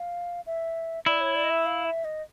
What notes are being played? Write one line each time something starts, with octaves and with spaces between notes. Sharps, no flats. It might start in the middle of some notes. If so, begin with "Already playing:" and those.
Already playing: F5
E5
E4 D5
C#5
D5
D#5
E5
F5
E5
D#5